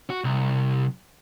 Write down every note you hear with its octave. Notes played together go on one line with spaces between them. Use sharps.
F#4
C2